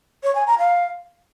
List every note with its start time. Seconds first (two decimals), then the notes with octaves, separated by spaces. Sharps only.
0.23 C#5
0.35 G#5
0.47 A#5
0.59 F5